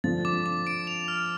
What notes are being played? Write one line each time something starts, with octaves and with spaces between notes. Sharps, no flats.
D3 F3 A6
D6
D6
D7
F7
F6